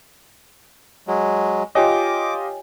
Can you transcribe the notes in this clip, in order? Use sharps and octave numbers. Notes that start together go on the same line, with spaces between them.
F#3 G#3
F4 G4 C#5 D#5 G5 G#5 D6